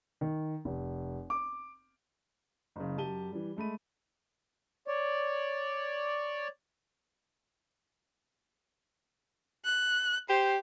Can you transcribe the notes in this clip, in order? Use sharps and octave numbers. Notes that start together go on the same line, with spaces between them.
D#3
F1
D6
F#1 C#3
F#2 G4 A5 D#7 G7
E3 G3
G#3 A3 B5 D#7
C#5 D5
F#6
G4 C5